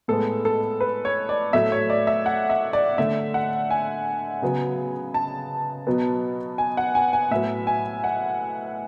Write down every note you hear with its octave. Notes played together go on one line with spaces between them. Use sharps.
A2 G#3 B3 A4
A4
B4
C#5
D5
A2 F#3 A3 E5
C#5
D5
E5
F#5
E5
D5
D3 A3 E5
F#5
G#5
C#3 F#3 B3
A5
B2 F#3 B3
G#5
F#5
G#5
G#5
A2 F#3 B3 E5
G#5
F#5